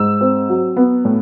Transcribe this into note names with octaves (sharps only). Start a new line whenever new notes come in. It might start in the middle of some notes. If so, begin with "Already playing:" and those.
Already playing: G#2 E6
C4
F#3
B3
A2